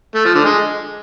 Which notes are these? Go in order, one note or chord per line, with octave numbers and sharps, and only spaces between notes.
A3
F3
D3
G#3